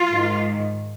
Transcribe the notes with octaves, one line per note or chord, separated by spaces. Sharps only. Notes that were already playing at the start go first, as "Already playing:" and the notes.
Already playing: F4
G#2 D#3